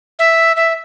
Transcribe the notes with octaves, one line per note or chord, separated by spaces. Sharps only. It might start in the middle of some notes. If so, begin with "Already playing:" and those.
E5
E5